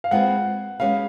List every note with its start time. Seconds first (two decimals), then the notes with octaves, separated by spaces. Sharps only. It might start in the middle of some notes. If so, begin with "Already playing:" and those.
0.04 F5
0.11 G#3 C4 F4 G#4 B4 F#5
0.80 G#3 C#4 F#4 B4 F5